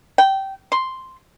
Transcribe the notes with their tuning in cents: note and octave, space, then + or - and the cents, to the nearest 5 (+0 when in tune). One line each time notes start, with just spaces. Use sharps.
G5 -15
C6 +0